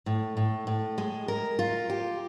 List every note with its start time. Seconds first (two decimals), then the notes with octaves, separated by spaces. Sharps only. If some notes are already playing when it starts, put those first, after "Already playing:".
0.06 A2
0.37 A2
0.67 A2
0.98 G#3
1.28 A#4
1.59 F4
1.90 G4